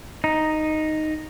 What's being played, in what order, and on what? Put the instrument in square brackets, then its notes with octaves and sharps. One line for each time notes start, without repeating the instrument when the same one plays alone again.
[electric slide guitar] D#4